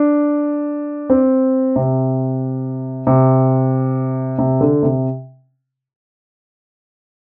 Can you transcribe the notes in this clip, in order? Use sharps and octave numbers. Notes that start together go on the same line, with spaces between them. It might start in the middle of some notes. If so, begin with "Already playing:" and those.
Already playing: D4
C4
C3
C3
C3
D3
C3